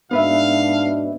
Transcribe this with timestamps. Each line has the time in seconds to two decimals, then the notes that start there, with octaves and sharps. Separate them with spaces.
0.11 G#2 B2 B3 D4 B4 E5 F5